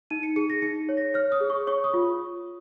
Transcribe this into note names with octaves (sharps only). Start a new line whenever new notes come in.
D#4 D#7
C#7
G#4 C#7
A#6
D#4 C#7
C#5
A#6
C#5 F6
D#6
G#4
C#6
C#5 C#6
D#6
F4